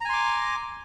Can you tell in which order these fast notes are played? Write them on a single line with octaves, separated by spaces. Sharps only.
A#5 G#5 C6 D6